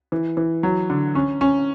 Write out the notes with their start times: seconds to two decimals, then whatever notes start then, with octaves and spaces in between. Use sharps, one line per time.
0.12 E3
0.37 E3
0.63 F#3
0.90 D3
1.15 C#4
1.41 C#4